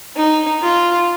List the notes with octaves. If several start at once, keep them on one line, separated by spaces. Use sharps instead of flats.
D#4
F4